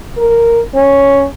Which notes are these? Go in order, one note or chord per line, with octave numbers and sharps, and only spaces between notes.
A#4
C#4